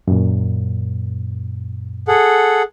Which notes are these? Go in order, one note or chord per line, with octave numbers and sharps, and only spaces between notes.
F#2 A#2
G#4 A4 F#5